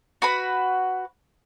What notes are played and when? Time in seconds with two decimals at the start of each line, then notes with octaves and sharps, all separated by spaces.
0.22 F#4 B4 B5